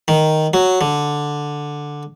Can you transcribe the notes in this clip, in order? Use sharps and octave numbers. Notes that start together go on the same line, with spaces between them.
D#3
F#3
D3